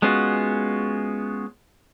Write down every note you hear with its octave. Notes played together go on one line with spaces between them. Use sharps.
G#3 B3 C#4 F4 F#4